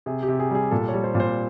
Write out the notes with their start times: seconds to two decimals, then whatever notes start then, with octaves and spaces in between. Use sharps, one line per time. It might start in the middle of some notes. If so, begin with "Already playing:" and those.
0.06 C3 G#4
0.23 G4
0.28 C3
0.40 G#4
0.50 G3 G#4
0.71 A#2 A4
0.88 C#5
0.94 G3
1.04 C5
1.15 A#2
1.20 C5